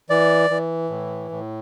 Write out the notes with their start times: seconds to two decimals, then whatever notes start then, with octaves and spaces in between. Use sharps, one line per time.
0.10 E3 D5
0.50 E3
0.90 A2
1.31 A2